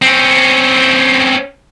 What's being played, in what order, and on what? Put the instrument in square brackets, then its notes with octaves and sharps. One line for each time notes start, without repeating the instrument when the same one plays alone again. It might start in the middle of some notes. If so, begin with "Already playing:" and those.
[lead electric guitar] C4 C#4